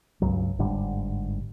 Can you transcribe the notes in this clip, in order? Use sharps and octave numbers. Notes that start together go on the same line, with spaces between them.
C#2 G2 F#3
G1 G#2 D3 G3